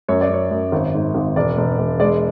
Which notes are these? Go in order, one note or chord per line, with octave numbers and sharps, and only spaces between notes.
F#2 C#5
D5
F#2 C#5
F#2
G#1
G#2
G#1
E1 D5
E1
E1
G#3 D5